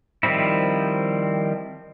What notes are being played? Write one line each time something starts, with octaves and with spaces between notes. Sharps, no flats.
D#3 F3 G3 C4 E4